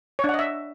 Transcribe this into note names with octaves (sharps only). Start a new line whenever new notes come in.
D4 C#5 D#5 E5 F#5